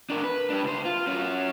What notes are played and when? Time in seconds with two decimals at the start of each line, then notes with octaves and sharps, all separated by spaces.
0.10 D4 A#4
0.24 B4
0.50 D4 G4
0.64 C#2 C5
0.85 F4
1.07 C#4 F#4